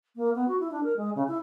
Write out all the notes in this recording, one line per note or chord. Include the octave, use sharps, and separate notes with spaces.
A#3
B3
F#4
E4
D4
A#4
G#3
C#3
E4